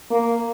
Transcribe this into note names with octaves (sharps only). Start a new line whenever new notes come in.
A#3